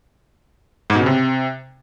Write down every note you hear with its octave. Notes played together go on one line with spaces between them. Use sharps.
G#2
B2
C#3
C3